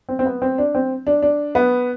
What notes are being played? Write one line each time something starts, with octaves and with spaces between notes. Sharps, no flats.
C4
C4
B3
C4
D4
C4
D4
D4
B3